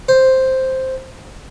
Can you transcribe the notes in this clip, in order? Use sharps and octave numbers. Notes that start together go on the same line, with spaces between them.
C5